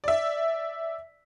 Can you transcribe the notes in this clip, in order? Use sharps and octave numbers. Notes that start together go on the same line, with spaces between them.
D5 E5